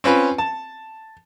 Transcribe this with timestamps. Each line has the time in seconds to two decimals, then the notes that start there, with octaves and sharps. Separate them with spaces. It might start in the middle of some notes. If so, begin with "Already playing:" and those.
0.04 C4 C#4 F4 B4
0.38 A5